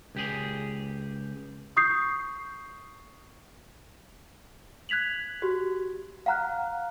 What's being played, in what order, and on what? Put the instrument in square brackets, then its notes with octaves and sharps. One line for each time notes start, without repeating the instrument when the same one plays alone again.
[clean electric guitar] C#2 G4 G#4
[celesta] C#6 D#6 G6 C7
F#6 G#6 B6 F7 F#7
F#4 G4
F5 F#5 A#5 F6 F#6